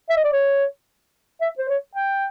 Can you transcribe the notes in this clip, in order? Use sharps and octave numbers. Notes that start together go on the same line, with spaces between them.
E5
D#5
D5
C#5
E5
C5
C#5
G5